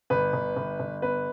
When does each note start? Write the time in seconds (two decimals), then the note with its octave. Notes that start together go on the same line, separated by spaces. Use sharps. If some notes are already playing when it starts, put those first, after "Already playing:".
0.10 G1 B4
0.33 G1
0.56 G1
0.80 G1
1.02 B3 B4